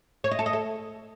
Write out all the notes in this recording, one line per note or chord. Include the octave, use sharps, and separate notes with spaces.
C#5
D#5
A4
D#5
A4